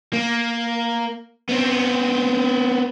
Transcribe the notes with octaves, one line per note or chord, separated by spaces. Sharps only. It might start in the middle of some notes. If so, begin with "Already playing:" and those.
A#3
B3 C4